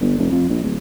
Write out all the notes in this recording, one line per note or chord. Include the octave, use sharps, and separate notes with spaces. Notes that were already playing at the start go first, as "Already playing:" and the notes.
G1
F1
F2
A#1
D1